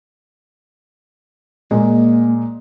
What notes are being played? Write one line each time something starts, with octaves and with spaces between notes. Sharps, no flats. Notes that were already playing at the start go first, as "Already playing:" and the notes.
A#2 G#3 A#3